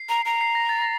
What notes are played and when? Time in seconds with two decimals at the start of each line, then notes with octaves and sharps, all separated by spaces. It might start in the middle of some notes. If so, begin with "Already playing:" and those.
Already playing: C7
0.09 A#5
0.25 A#5
0.41 C7
0.55 A#6
0.69 A6
0.82 A#6